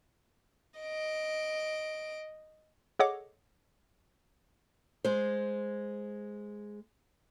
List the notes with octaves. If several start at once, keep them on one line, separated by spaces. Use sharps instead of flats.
D#5 D7
G#4 A4 C#5 D#5 F#5 D6
G#3 C5